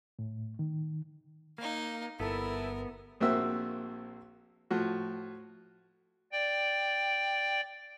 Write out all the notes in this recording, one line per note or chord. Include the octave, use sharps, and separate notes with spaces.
A2
D#3
A#3 D#4 F5
G1 B3 E4 A4 A#4
A#1 A#3 C4 F#4 E5 E6
A2 F3 F#4
D5 G5